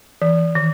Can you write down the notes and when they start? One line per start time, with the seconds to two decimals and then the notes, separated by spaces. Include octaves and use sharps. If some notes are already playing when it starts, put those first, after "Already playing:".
0.22 E3
0.55 D#3